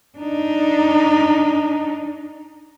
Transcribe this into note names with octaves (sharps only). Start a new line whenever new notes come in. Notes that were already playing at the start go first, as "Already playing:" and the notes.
D4 D#4